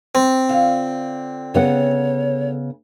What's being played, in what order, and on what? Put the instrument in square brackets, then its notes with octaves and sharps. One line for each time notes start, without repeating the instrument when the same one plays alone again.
[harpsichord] C4
[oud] D3 F4 F5
[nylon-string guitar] C#3 B3 F#5 [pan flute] C#5